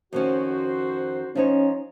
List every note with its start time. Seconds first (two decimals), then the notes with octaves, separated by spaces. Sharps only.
0.13 F2 D#3 C#4 F#4 C5
1.35 F3 C#4 D#4 C#5